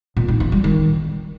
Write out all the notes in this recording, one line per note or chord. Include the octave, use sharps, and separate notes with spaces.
A#2
D#4
E3
G3
D#3